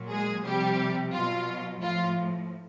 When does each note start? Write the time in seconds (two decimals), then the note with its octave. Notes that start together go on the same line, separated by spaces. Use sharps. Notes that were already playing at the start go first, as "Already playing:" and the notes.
Already playing: A#2 F#3
0.10 G#3 G#4
0.45 C3 F3 G3 G4
1.13 B2 F#3 F4
1.82 A2 F3 F4